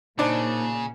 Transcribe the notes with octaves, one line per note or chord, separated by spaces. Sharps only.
A#2 C#3 D4 D#4 C5 D5 A5